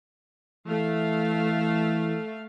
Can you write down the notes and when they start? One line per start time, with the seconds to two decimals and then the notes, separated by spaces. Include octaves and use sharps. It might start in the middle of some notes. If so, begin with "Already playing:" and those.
0.66 E3 A3 F5